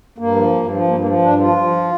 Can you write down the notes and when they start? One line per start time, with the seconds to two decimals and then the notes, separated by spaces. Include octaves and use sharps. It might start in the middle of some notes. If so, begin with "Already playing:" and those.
0.18 G2 A#3
0.36 F3
0.53 G2
0.71 F3
0.87 G2 A#3
0.99 A#3
1.05 F3
1.22 G2 D4
1.39 F3 F4
1.56 F3